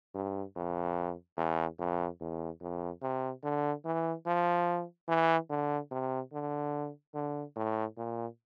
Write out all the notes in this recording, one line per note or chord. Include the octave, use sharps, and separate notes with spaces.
G2
F2
E2
F2
E2
F2
C3
D3
E3
F3
E3
D3
C3
D3
D3
A2
A#2